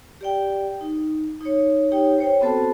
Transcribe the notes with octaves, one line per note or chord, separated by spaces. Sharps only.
G4 D5 G5
D#4
D#4 C#5
D#4 G4 C#5 G5
C5 C#5 G5
B3 C4 F#4 A4 C5 A5